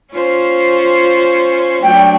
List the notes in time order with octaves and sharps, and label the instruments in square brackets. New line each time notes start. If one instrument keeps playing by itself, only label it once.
[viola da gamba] C#4 F4 C5
[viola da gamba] F#3 A3 D4 [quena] G5